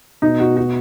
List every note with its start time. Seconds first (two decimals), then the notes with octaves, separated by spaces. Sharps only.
0.22 B2 D#4
0.40 F#4
0.57 F#4